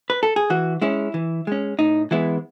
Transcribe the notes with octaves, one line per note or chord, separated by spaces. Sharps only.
B4
A4
G#4
E3 F#4
G#3 C#4 E4
E3
G#3 C#4
A2 D#4
E3 G#3 B3 E4